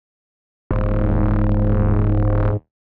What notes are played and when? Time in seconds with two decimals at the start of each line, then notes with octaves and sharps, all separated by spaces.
0.71 D#1 G#2